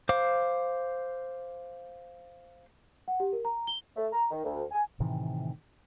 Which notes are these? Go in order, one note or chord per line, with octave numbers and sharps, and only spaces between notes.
C5 F5 D6
F#5
G4
A#4
A#5
G7
A3
A#5
D#3
D2
G#5
A2 C3 D#3 E3